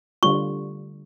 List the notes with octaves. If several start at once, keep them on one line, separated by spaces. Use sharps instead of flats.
D3 G3 F4 C#6